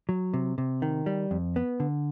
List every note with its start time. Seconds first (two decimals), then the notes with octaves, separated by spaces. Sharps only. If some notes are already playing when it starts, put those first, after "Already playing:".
0.09 F#3
0.34 C3
0.58 C3
0.82 D#3
1.06 G3
1.31 F2
1.56 B3
1.80 D3